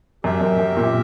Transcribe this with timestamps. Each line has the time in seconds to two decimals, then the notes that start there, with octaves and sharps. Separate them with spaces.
0.24 F#2 G4 A#4 E5 G5
0.41 F#2
0.59 F#2
0.77 A#2